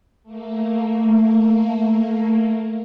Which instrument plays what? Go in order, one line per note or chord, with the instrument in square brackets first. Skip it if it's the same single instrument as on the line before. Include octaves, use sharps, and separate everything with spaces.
[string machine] A3 A#3